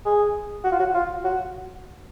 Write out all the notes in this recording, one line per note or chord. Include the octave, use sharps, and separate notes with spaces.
G#4
F#4
F4
F#4
F4
F#4